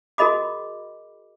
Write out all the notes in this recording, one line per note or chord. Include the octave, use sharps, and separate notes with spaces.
F#4 G#4 A#4 D#5 B5 D6